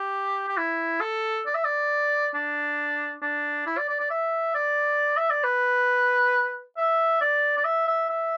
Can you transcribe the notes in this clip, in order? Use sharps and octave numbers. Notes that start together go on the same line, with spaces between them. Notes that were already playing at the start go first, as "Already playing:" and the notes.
Already playing: G4
G4
E4
A4
D5
E5
D5
D4
D4
E4
D5
D5
D5
E5
D5
E5
D5
B4
E5
D5
D5
E5
E5
E5